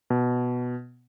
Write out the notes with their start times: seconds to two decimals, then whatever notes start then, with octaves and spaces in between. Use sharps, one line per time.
0.10 B2